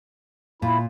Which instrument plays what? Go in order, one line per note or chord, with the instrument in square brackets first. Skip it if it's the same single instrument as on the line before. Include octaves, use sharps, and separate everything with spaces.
[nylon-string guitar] A#2 [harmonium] E4